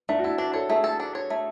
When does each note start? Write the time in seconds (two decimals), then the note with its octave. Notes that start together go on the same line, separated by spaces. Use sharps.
0.09 A3 D4
0.19 F#4
0.24 E4 A4
0.38 D4 F#4
0.53 A4 C#5
0.69 A3 G#4
0.84 A4
1.00 D4
1.15 C#5
1.30 A3